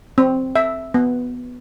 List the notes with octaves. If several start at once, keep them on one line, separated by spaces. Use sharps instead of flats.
C4
E5
B3